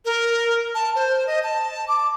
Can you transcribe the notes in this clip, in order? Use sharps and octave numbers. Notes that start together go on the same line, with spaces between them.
A#4
A5
C5
D#5
A5
D6